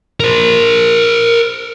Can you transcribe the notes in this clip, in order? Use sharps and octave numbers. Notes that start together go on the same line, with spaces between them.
A#4 C5